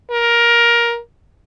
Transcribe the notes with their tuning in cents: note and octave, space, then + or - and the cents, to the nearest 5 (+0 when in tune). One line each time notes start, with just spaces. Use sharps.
A#4 +15